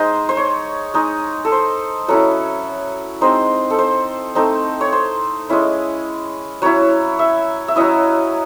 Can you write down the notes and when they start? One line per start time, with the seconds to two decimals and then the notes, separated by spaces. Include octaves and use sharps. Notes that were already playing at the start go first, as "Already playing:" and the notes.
Already playing: G#3 D#4 C5
0.29 C5
0.37 C#5
0.94 G#3 D#4
1.45 A4
1.52 C5
2.08 F#3 C#4 E4 A4
3.21 G#3 C4 D#4 C5
3.70 A4
3.79 C5
4.35 A3 C4 D#4
4.81 C#5
4.93 C5
5.49 G#3 C#4 E4
6.62 F#3 C#4 E4 C#5
7.19 E5
7.68 E5
7.76 F#3 C#4 E4 D#5